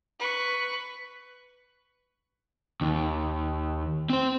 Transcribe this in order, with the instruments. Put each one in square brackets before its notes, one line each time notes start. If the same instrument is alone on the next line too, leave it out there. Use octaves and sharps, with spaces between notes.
[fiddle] B4 C#6
[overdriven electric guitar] D#2
C4 C5